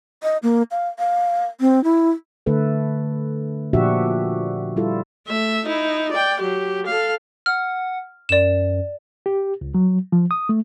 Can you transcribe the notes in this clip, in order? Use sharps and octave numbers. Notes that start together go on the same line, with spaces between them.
D#5
A#3
F5
F5
C4
E4
D3 A3 A4 B4
A#2 F3 D4 F#4 G4 E5
G3 E4 F4 A4
A3 E5
D#4 E4
D5 G5
F#3 G4
A4 F5
F#5 F6
F#2 D5 E7
G4
C#2
F#3
F3
D#6
A3